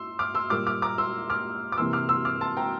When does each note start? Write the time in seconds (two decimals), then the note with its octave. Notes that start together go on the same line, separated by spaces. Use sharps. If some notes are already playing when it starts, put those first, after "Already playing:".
Already playing: C6 E6
0.19 D6 F6
0.35 C6 E6
0.50 A#2 G3 A#3 D6 F6
0.67 D6 F6
0.82 A#5 D6
0.98 C6 E6
1.30 D6 F6
1.72 D6
1.78 C3 E3 A#3 C6 E6
1.93 D6 F6
2.09 C6 E6
2.25 D6 F6
2.41 A5 C6
2.57 G5 A#5